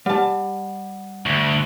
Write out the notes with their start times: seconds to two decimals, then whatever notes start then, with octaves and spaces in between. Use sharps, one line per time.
0.06 G3 F#5 A5
1.26 D2